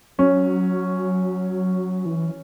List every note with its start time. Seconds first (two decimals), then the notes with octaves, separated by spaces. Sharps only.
0.18 F#3 C#4
2.06 E3